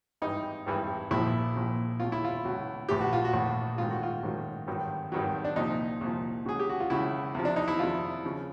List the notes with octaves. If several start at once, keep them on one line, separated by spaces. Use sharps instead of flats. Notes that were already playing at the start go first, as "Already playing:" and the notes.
G#1 G2 E3 D#4
G#1 G2 E3
A#1 A#2 F3 E4
A#1 A#2 F3
C#2 B2 F#3 F4
E4
F4
C#2 B2 F#3
A#1 A2 E3 G4
F#4
F4
F#4
A#1 A2 E3
A1 G#2 D#3 F#3 F4
F#4
F4
A1 G#2 D#3 F#3
G#1 G2 D#3 F#3
G#1 G2 D#3 F#3
D4
C2 A#2 F3 D#4
C2 A#2 F3
C#2 C#3 F#3 G#4
G4
F#4
F4
C#2 C#3 F#3 E4
E2 C3 F3
D4
D#4
E4
E2 C3 F3 F4
C#3 F3